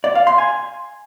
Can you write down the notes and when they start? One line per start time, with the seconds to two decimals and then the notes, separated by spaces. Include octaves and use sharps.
0.04 D5
0.15 F5
0.27 C6
0.38 G#5